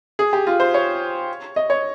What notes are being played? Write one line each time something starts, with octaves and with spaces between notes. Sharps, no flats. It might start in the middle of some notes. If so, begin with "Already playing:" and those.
G#4
G4
F4
C5
C#5
D#5
C#5